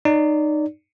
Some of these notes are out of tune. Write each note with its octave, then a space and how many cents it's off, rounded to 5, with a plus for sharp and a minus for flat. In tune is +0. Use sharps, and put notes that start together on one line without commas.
D#4 -25 D5 -25